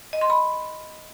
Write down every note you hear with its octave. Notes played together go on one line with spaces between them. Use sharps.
D#5
C6
B5